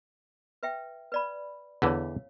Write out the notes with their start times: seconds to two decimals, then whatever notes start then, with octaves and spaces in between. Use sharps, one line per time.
0.63 B4 E5 G5
1.12 B4 D5 B5
1.82 E2 D3 E3 C#5 F5